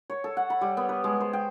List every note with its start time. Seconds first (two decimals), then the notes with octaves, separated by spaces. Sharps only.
0.10 C#5
0.24 A4
0.37 F#5
0.50 B5
0.61 G3
0.77 B3
0.89 B4
1.04 G#3
1.21 C5
1.33 G5